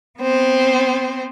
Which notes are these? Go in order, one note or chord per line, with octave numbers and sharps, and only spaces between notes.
B3 C4 C5